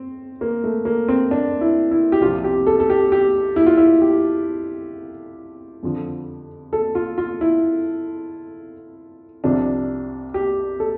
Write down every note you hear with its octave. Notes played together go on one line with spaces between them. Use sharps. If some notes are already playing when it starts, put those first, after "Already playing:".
Already playing: C4
A#3
A3
A#3
C4
D4
E4
E4
G4
C2 C3 F3 F4
G4
A4
A4
G4
G4
E4
F4
E4
G4
F2 D3 F3
A4
F4
F4
E4
C2 C3 F3 D4
G4
A4